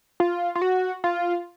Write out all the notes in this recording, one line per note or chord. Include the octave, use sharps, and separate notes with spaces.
F4
F4
F#4
F4